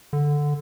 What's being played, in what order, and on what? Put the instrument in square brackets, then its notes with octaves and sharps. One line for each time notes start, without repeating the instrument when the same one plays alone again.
[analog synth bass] D3